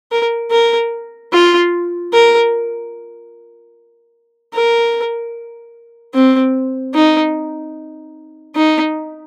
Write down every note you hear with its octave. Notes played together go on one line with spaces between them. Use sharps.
A#4
A#4
F4
A#4
A#4
C4
D#4
D#4